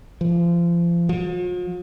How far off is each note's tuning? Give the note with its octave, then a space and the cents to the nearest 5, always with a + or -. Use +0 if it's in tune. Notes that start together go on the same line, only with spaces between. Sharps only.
F3 -30
F3 +45